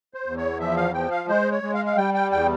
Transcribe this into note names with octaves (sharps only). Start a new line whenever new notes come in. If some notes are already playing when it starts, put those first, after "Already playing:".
C5
E2
C#5
F3 E5
F5
F3 G5
F5
G#3 C5
C#5
G#3
F5
F5
G3 G5
G5
E2 G5